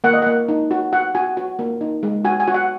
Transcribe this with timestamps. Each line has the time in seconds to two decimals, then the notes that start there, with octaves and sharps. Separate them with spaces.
0.04 A#3 F#5
0.13 D#5
0.22 A#3 F#5
0.48 D#4
0.71 F#4
0.93 F#4 F#5
1.15 F#4 G#5
1.37 F#4
1.59 A#3
1.81 D#4
2.03 G#3
2.25 F#4 G#5
2.40 G#5
2.47 F#4
2.54 F#5